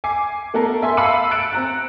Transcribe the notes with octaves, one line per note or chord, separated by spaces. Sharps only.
G#5 D6 C7
A3 B3 A4 A#4
E5 G#5 C6
F5 A5 B5 E6 C#7 D#7
F#6 A6 C#7 D7 E7
C4 A#5 F#6